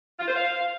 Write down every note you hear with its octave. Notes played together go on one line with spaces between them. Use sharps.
F4
C5
F5